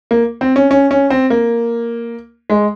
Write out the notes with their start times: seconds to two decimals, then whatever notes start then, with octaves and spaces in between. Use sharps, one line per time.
0.11 A#3
0.41 C4
0.56 C#4
0.71 C#4
0.91 C#4
1.10 C4
1.30 A#3
2.50 G#3